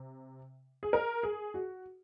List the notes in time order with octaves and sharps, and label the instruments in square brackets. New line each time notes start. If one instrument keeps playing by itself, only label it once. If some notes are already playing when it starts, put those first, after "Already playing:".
Already playing: [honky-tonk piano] C3
G#4
A#4
G#4
F#4